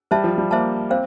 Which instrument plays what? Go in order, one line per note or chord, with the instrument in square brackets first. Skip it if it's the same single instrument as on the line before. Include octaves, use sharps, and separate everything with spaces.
[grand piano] G3 [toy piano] C5 E5 A5
[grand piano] F3
G3
[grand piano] A#3 [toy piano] C5 E5 A5
[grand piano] C4 [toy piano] C5 F5